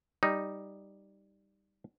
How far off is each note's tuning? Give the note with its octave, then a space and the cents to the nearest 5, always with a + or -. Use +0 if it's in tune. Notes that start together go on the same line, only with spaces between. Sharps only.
G3 +0 D#4 +0